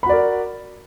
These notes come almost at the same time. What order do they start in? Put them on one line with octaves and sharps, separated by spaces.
B5 F#4 D5 A#4